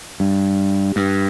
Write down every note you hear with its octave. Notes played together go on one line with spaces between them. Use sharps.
G2
G2